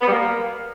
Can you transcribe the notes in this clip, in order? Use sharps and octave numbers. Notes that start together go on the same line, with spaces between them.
B3
G3
A#3